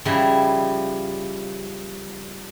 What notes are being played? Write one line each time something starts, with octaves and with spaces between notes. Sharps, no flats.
C#3 F3 G3 D#4 E4